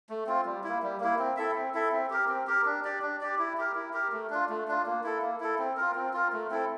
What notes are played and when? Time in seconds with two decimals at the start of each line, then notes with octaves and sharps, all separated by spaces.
0.09 A3
0.27 C4 F4
0.45 G3
0.64 A#3 E4
0.82 G3
1.00 A#3 E4
1.19 C4
1.37 E4 A4 E5
1.55 C4
1.74 E4 A4 E5
1.92 C4
2.10 G4 A#4
2.28 C4
2.47 G4 A#4
2.65 D4
2.84 G4 D5
3.02 D4
3.21 G4 D5
3.39 E4
3.57 G4 A#4
3.75 E4
3.93 G4 A#4
4.12 A3
4.30 D4 F4
4.49 A3
4.68 D4 F4
4.86 A#3
5.04 E4 A4
5.22 A#3
5.40 E4 A4
5.58 C4
5.77 F4 A#4
5.95 C4
6.13 F4 A#4
6.33 A3
6.51 C4 E4 A4